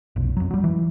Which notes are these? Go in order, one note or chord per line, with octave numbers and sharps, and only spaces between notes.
F1 B1
F2 F#3
F#3 G3
E3